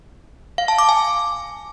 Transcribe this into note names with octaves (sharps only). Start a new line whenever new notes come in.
F5
A5
D6
G#5